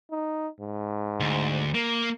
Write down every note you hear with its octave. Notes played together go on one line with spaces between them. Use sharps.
D#4
G#2
D2
A#3